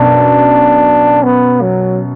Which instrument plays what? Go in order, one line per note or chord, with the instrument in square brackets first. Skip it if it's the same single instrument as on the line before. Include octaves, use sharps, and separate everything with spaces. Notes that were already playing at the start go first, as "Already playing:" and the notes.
Already playing: [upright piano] F#2 B2 [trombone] D4
[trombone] B3
F#3